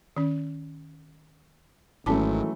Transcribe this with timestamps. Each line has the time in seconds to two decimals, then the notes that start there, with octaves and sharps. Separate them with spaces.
0.16 D#3 C#4
2.06 G#1 E3 F#3 A3 C#4 A5 D6